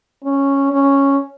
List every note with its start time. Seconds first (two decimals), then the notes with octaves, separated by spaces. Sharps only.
0.24 C#4
0.73 C#4